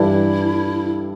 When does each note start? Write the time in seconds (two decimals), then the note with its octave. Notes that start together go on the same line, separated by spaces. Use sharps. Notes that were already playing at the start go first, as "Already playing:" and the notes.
Already playing: G2 E3 G3 D4 E4 A4